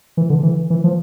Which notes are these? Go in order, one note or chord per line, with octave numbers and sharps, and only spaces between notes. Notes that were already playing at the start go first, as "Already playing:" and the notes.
E3
D3
E3
E3
F3